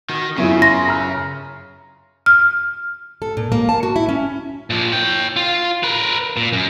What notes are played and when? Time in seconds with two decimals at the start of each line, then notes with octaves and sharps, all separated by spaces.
0.09 D#3 F#4
0.38 F#2 C#3 B3 E4 F4 B4 E5
0.62 C6 A#6
0.88 A#5 F6
2.26 F6
3.22 A4
3.37 A#2
3.52 A#3
3.69 A5
3.83 F#4
3.96 E4
4.09 C#4
4.70 A#2 F3
4.92 C#5 G5
5.36 F4
5.83 A#4 B4
6.37 A#2
6.52 F#2